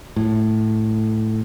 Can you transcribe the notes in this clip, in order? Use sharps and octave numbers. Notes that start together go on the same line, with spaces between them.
A2